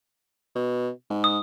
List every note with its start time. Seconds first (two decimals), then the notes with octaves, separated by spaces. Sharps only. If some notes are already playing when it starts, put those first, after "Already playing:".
0.55 B2
1.10 G#2
1.24 D#6